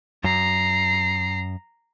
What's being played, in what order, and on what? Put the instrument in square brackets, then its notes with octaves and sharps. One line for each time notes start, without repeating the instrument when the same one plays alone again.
[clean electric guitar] F#2 [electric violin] A#5 C7